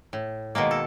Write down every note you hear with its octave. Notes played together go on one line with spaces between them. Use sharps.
A2
B2 D#3 G#3 A#3
A4